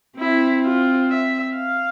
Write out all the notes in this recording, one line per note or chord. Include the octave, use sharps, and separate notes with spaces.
C4 E4
F4
E5
F5